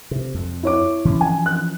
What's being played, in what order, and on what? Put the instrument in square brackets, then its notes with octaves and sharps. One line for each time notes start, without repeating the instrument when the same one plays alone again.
[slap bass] C3
F2
[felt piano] E4 C#5 D6
[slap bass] E3 F3 C#4
[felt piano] G#5
F#6